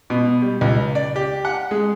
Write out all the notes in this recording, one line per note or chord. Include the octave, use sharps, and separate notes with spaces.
B2
G3
C#2
D5
G4
F#5
G#3